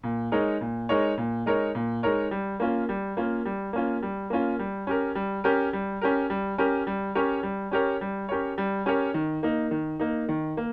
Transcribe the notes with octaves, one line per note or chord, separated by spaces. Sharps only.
A#2
G#3 D#4 A#4 C#5
A#2
G#3 D#4 A#4 C#5
A#2
G#3 D#4 A#4 C#5
A#2
G#3 D#4 A#4 C#5
G3
A#3 C#4 F4
G3
A#3 C#4 F4
G3
A#3 C#4 F4
G3
A#3 C#4 F4
G3
C#4 G4 A#4
G3
C#4 G4 A#4
G3
C#4 G4 A#4
G3
C#4 G4 A#4
G3
C#4 G4 A#4 C#5
G3
C#4 G4 A#4 C#5
G3
C#4 G4 A#4 C#5
G3
C#4 G4 A#4 C#5
D#3
A#3 D#4
D#3
A#3 D#4
D#3
A#3